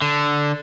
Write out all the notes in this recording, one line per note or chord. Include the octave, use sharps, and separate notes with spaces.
D3